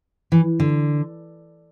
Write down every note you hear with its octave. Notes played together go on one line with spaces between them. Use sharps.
E3
D3